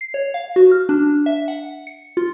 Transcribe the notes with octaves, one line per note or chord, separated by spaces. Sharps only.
C7
C#5
F5
F#4
F6
D4
E5
F#5
C#7
F4